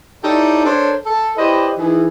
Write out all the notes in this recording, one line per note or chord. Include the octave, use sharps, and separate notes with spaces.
D#4 E4 G4 A4 C#5 D5
D4 A4 A#4 C5 C#5
A4
E4 G4 B4 C5 D5 D#5
D#3 E3 G#4